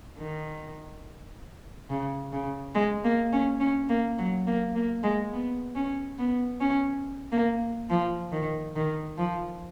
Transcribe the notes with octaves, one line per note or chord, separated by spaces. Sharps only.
D#3
C#3
C#3
G#3
A#3
C#4
C#4
A#3
F#3
A#3
A#3
G#3
B3
C#4
B3
C#4
A#3
F3
D#3
D#3
F3